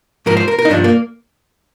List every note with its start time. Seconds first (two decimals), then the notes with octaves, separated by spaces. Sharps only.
0.26 G#2 F3 A#4
0.37 C5
0.48 A#4
0.59 A#4
0.65 D#4
0.70 G2 F3 D4
0.84 A#3